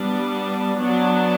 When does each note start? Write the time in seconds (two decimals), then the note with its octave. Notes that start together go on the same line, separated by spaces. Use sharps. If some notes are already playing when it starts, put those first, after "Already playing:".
Already playing: G3 B3 D4
0.78 F#3 B3 D4